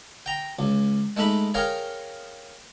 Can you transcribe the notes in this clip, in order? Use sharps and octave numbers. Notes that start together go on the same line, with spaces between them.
G5 A#5
C#2
G#3 A3 D#4 B5
G#4 A#4 C#5 F5 G5